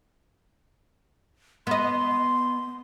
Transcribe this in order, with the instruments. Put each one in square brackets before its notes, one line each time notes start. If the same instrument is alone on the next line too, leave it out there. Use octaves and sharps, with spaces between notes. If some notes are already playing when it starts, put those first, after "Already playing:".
[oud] B3 D#5 [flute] C6